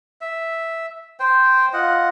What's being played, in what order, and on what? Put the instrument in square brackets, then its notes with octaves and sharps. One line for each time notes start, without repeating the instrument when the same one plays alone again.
[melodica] E5
C5 G5
F4 D#5 F#5